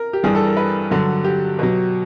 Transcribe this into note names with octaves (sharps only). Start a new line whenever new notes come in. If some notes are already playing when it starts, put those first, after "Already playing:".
Already playing: A#4
G4
G2 E3 G3 G#4
A4
A#4
B4
G2 D3 F#3
G4
B2 F#3